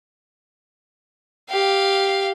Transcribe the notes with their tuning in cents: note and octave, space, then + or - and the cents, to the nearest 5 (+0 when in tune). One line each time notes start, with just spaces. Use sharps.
G4 +0 F5 +0